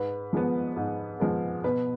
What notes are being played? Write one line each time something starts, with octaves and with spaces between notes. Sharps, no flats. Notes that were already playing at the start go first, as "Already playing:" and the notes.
Already playing: G#2 B4
F3 G#3 B3
G#2
F3 G#3 B3
B2 B4